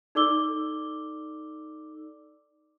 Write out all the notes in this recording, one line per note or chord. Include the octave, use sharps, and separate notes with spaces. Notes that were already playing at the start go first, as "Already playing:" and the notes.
D#4 A4 D5 D6 E6 G7